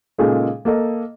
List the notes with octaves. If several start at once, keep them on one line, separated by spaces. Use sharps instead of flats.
A#2 C#3 G#3 D#4 G#4 A4
A#3 A4 D#5